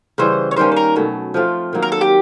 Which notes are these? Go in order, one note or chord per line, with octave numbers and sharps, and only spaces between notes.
C#3 E3 G3 C5
C#5
D#3 G3 A#3 C#4 C5
A4
A#4
B2 F#3 A3
F3 A3 C4 F4
D#3 F#3 A#3
A#4
A4
G4